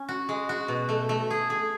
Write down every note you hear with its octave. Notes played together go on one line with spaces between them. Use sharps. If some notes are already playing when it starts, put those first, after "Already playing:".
Already playing: C#4
F#4
G#3
F#4
B2
A3
A3
G#4
G#4